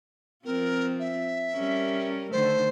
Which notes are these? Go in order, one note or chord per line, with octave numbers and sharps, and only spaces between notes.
F3 C4 F4 A#4
E5
G3 C#4 A#4
D3 D#3 A3 C5